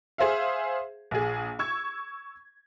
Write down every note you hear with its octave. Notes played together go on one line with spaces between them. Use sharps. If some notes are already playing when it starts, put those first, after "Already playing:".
G#4 C5 E5 F5
A#1 G#4
C#6 E6 G#6